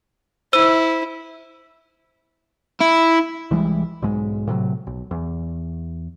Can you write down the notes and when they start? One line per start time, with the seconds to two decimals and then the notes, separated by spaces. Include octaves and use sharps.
0.53 E4 C5 E6 D#7
2.81 E4
3.51 C2 E3 G3 G#3
4.02 B1 G#2 G#3
4.47 A2 C3 E3 F#3
4.87 B1
5.11 E2